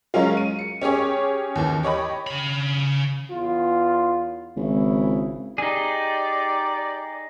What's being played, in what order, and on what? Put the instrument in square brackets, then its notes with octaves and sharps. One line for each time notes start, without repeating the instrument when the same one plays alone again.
[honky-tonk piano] F#3 G#3 C#4 F4
D#7
C#7
C#4 G4 G#4 C#5
D#2 E3
G4 C#5 D#5 B5
[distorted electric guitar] C#3 B5
[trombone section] E2 F4
[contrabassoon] G#1 [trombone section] C#3 E4
[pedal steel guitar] D#4 G#4 [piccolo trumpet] G4 [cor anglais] D5